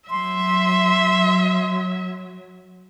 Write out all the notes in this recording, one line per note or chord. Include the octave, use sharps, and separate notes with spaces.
F#3 E5 C6